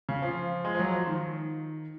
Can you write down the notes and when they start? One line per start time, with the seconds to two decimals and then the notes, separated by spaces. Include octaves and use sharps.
0.09 C#3
0.22 F3
0.65 G#3
0.75 F3
0.79 F#3
0.93 F3
1.07 D#3